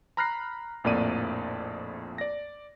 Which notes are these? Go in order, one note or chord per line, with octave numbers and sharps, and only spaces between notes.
A#5 B5 F6 F#6 A#6 C7
A#1 F2 A2 A#3 D5 D#7
D5 A#6